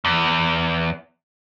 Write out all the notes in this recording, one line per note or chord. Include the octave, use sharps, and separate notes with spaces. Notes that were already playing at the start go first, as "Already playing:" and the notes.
E2